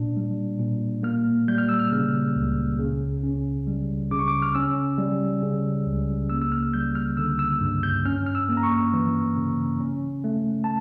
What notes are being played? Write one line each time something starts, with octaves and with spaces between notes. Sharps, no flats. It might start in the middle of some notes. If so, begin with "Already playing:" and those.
Already playing: A#2 D4
G3
A#2
A#3 F6
G3 G6
F6
E6
F6
C#3
C#2
C#3
C#4
G3
C#3 D6
C#6
D6
F6
C#4 E6
G3
C#3
C#2
A#3 E6
E6
F6
G3 G6
F6
D3 E6
E6
G2
G6
C#4 F6
F6
E6
A#3
A#5
C#6
E3
C#3
C#4
A3
A5